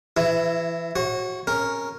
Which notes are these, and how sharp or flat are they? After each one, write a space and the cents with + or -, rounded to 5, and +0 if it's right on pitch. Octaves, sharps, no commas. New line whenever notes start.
E3 +30 E4 +0
F#4 +0 C#5 -40
C#4 -10 A#4 +0